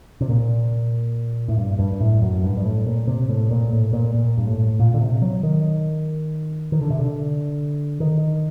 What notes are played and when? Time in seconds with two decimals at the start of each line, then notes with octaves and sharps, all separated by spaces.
0.21 C3
0.29 A#2
1.48 A2
1.57 G2
1.79 G2
1.92 G2
2.00 A2
2.22 F#2
2.43 G2
2.57 G2
2.65 A2
2.87 A#2
3.07 C3
3.29 A2
3.51 A#2
3.72 A2
3.93 A#2
4.14 A#2
4.38 G2
4.47 A2
4.79 A#2
4.94 D3
5.00 C3
5.22 F#3
5.43 D#3
6.72 D#3
6.81 D3
6.90 C3
6.99 D3
8.00 D#3